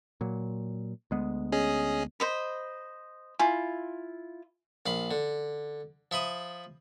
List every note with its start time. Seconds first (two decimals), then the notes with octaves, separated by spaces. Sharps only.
0.21 A#2 F#3
1.11 D2 G#3 B3
1.52 C#4 G#4 D#5
2.20 C5 D#5 B5
3.39 E4 F4 G#5
4.86 A#1 F5 B5
5.11 D3
6.11 F3 E5 B5 D#6